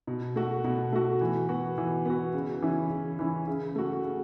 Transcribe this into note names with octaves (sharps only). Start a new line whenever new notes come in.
B2
A3 F#4
B2
A3 F#4
E3
B3 F#4
E3
B3 F#4
C#3
E3 C#4 E4
C#3
E3 C#4 E4
C#3
A3 F#4
C#3